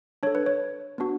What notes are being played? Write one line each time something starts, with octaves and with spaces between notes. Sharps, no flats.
D4 A4 C#5
B4
C#5
B3 D4 F#4